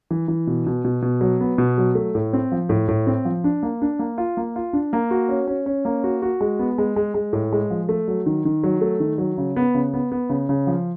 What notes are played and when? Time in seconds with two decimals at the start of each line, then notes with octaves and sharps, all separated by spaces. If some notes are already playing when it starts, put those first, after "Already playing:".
0.11 E3
0.28 E3
0.47 B2
0.66 B2
0.84 B2
1.02 B2
1.21 F#3
1.41 B3
1.58 B2
1.78 F#3
1.95 A3
2.15 A2
2.33 C4
2.52 F3
2.69 A2
2.88 A2
3.07 C4
3.25 F3
3.44 D4
3.63 A#3
3.82 D4
3.99 A#3
4.18 F4
4.37 A#3
4.56 F4
4.73 D4
4.93 A#3
5.11 F#4
5.29 C#4
5.47 C#4
5.66 C#4
5.85 A#3
6.04 F#4
6.22 F#4
6.41 G#3
6.59 B3
6.78 G#3
6.96 G#3
7.14 G#3
7.33 A2
7.52 G#3
7.70 F3
7.89 A3
8.08 F#3
8.26 D#3
8.45 D#3
8.64 F#3
8.81 A3
9.00 D#3
9.18 F#3
9.38 C#3
9.56 B3
9.74 C#3
9.94 B3
10.12 B3
10.29 C#3
10.49 C#3
10.67 F3